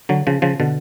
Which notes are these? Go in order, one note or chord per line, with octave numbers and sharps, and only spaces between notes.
D3 F#3
C#3 F3
C#3 F3
B2 D3